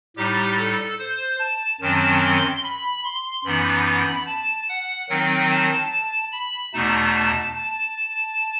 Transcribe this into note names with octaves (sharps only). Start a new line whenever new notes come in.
A2 G3 D#4 G4
A4
C5
A5
F#2 D#3 F#3 C4 A5
C6
B5
C6
F#2 E3 B3 D#4 B5
B5
A5
F#5
D#3 F#3 C4 D#4 G5
A5
B5
E2 B2 A3 D#4 A5
A5
A5